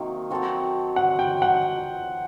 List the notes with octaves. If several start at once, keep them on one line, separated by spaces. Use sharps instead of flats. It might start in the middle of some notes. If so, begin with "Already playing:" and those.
Already playing: C3 D#3 F#3 A#3
F#3 C4 F#4 A4
F#5
G5
F#5